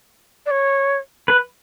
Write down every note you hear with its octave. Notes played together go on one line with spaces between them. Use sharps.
D5
C#5
B4